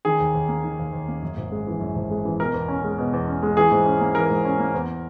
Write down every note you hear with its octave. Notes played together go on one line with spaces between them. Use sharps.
D#3 G#4
D#2
D#2
A#3
D#3
D#2
D#2
A#3
F#2
G#1
G#3
E3
F#2
G#1
G#3
E3
B2 A#4
E2
C#4
G#3
B2
E2
C#4
G#3
E3 G#4
G#2
C#4
A#3
E3 A#4
G#2
C#4
A#3
E2